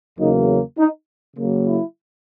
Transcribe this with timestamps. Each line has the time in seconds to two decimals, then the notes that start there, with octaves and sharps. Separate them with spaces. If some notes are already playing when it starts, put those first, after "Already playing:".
0.19 E2 C#3 F#3 A#3 D#4
0.78 D#4
1.37 C#3 F#3 A#3
1.67 E4